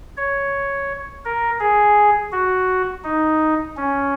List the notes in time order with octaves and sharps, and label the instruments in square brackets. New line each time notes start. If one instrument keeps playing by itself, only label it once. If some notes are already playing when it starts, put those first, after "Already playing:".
[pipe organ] C#5
A#4
G#4
F#4
D#4
C#4